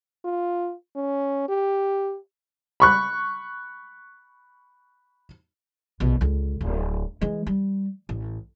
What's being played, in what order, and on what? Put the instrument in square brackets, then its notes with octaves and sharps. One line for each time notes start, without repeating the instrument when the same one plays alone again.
[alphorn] F4
C#4
G4
[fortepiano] B5 C#6 F#6
[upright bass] A#1 B2
C#2 D3
D1
E3 G#3
G3
A1